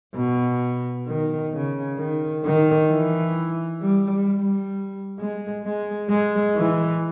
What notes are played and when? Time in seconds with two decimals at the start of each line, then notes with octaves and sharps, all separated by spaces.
0.15 B2
1.07 D#3
1.53 C#3
1.98 D#3
2.44 D#3
2.89 E3
3.82 G3
4.27 G3
5.19 G#3
5.65 G#3
6.10 G#3
6.56 E3